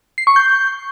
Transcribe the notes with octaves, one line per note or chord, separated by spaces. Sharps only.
C7
C#6
G6